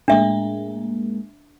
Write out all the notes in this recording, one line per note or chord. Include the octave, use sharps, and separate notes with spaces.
A2 G#3 A#3 D4 E5